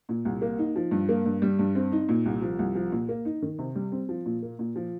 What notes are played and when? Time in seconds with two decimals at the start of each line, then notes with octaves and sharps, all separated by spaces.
0.09 A#2
0.25 C2
0.42 A#3
0.59 D#4
0.76 F3
0.91 G2
1.09 A#3
1.25 G2
1.42 G3
1.59 G2
1.75 C4
1.92 D#4
2.09 A#2
2.26 C2
2.42 F3
2.59 C2
2.75 F3
2.92 A#2
3.09 A#3
3.25 D#4
3.42 D#3
3.59 C3
3.76 G3
3.92 C4
4.09 F3
4.26 A#2
4.43 A#3
4.59 A#2
4.76 F3